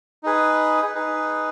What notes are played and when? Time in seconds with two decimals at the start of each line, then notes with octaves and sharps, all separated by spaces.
0.23 D#4 G#4 B4
0.95 D#4 G#4 B4